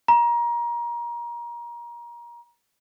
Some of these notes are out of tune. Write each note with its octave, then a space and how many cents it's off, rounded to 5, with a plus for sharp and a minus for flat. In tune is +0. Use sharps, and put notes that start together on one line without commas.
A#5 +25